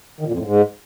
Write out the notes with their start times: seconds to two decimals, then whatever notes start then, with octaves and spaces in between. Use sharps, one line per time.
0.20 D#3
0.27 A#2
0.33 F2
0.39 A2
0.45 G#2